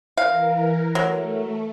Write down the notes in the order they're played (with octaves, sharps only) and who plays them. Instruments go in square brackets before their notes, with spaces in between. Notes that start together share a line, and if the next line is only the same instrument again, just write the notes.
[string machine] E3 A#4 [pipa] F5
[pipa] F#3 [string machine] A3